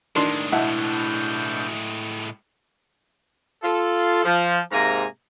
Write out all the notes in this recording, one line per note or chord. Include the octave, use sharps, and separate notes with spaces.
A2 D#3 G#3 D4 D5 C6
B2 D4 E4 E5 F#5 A5 G6
F4 A4
F3
G#2 C3 A#3 G#4 A#5